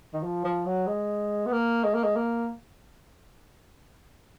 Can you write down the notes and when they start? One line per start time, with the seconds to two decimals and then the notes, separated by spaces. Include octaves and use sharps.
0.13 D#3
0.23 F3
0.44 F3
0.66 F#3
0.87 G#3
1.46 B3
1.52 A#3
1.84 G#3
1.94 A#3
2.04 G#3
2.16 A#3